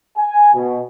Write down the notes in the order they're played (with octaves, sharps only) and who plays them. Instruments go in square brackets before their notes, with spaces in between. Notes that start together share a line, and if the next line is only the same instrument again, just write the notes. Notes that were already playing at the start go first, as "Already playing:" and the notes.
[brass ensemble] G#5
B2